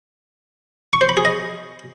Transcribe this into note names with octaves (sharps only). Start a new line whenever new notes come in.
C#6
C5
B5
G#4
D#5